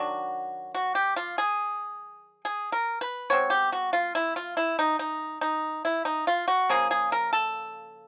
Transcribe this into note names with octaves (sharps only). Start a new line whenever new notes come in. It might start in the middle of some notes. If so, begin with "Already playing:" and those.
Already playing: D#3 F#3 D4 F#4
F#4
G4
F4
G#4
G#4
A#4
B4
B2 G#3 C4 C#5
G4
F#4
F4
E4
F4
E4
D#4
D#4
D#4
E4
D#4
F4
F#4
C#3 F3 A#3 G#4
G#4
A#4
A4